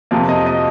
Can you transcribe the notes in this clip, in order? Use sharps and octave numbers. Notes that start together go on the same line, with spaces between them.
F2 C3 F3 A#3
D#5
D#5